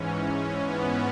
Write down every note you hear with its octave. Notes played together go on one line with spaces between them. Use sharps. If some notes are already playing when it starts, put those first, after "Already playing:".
Already playing: G#2 E3 C#4
B3